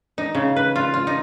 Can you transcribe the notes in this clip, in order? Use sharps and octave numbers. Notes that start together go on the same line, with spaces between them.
D#4
C#3
B4
F4
F4
D#4